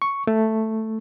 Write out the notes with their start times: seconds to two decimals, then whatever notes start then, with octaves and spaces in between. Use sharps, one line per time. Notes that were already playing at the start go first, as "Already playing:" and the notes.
0.02 C#6
0.27 A3